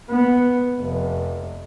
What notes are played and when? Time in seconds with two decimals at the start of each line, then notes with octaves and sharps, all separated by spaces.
0.10 B3
0.80 F1